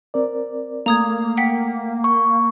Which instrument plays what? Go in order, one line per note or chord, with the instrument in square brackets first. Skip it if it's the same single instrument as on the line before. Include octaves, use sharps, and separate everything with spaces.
[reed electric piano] C4 A#4 D5
[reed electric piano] A3 [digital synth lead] A#3 [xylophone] A#5 D#6 G#6
[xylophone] F#5 G5 B6
[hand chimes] C#6